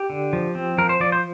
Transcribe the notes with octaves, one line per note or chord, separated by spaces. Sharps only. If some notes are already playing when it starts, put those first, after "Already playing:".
Already playing: G4
D3
F3
C4
F3 A#4
C5
F3 D5
C5